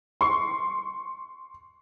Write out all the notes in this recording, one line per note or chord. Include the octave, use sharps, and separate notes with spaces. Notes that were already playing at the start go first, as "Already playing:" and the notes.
C6 C#6